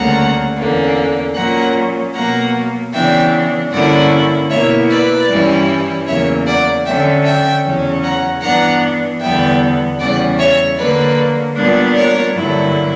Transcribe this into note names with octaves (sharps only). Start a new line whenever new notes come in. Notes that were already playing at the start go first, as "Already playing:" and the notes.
Already playing: D2 C#3 G3 A#3 F#5 A#5
E2 D3 A#3 C#4
A#2 F#3 A#3 C#4 F#5 A#5
B2 F#3 A#3 F#5 A#5
C#3 E3 B3 D4 E5 G5
G2 D3 A#3 C#4 E4 D5 F#5
B2 A#3 E4 C#5 E5
B4 D5
G2 E3 G3 C#4 E4
E2 C#3 F#3 A#3 C#5 E5
D5 F#5
D3 F#3 C#4 E5 G5
E5 G5
E2 C#3 F#3 C#4
F#5 A#5
G2 E3 B3 D4 F#5 A#5
E2 D3 G3 B3 E5 G5
E2 C#3 G3 D5 F#5
C#5 E5
D3 F#3 A#3 B4 D5
A#2 G3 B3 D4
A#4 C#5
G2 D3 F#3 A#3 E4